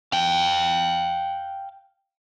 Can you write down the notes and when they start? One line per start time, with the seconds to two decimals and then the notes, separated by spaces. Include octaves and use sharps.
0.12 F5 G5